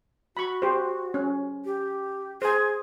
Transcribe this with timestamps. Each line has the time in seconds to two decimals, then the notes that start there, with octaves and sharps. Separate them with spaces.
0.37 F#4 B5 C#6
0.62 G4 C5
1.14 C#4
1.65 G4
2.42 G#4 C5 G#5